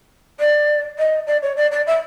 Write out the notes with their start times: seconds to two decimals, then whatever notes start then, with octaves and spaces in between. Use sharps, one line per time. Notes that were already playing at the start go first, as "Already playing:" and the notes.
0.40 D5
0.99 D#5
1.27 D5
1.43 C#5
1.56 D5
1.72 D5
1.87 E5